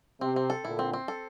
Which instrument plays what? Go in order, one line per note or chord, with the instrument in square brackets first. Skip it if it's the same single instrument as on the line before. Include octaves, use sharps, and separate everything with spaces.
[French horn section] C3 [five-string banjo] C4
[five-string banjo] C4
A4
[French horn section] A#2 D3 [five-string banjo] E4
[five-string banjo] C4
C4
A4